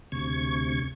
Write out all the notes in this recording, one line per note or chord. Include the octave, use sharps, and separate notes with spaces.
D2 C3 C#6 G#6